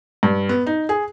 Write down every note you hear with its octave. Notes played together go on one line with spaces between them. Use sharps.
G2
B3
D#4
G#4